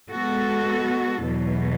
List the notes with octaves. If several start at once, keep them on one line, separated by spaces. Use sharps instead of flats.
G#3 B3 F#4 A4
E2 B2 F#3